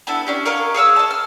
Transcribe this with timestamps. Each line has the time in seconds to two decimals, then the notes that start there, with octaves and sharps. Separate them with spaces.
0.07 B3 D4 E4 A4
0.27 C#4 D4 G4
0.45 A#4 C#5 D#5 F5
0.74 G#4 C#5 F5 E6
0.96 D#5 A5
1.11 F6